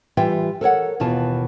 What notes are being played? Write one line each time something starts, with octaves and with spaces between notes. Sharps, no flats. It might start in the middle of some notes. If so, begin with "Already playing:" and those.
E3 G3 F4 E5 G5
A4 A#4 C#5 F#5
D#2 B2 E3 F4 A5